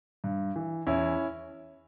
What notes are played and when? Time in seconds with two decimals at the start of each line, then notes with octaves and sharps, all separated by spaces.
0.24 G2
0.56 E3
0.87 E2 C#4 E4